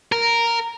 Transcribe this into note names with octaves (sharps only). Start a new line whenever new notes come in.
A#4